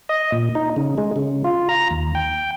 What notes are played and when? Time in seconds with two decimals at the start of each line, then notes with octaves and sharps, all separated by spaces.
0.09 D#5
0.32 A#2
0.55 D#4
0.76 C#3
0.98 G#3
1.16 C#3
1.44 F4
1.69 A#5
1.91 D#2
2.15 G5